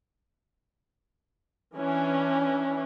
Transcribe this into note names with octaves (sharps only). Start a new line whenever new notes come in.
E3 C#4 D4